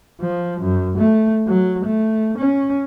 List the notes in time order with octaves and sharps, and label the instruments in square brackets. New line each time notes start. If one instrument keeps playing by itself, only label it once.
[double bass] F3
F#2
A3
F#3
A3
C#4